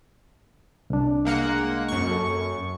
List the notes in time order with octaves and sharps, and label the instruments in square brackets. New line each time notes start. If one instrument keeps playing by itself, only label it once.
[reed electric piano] C2 D4
[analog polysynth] G#3 A#3 F#5
F#2 C#6
[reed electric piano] A4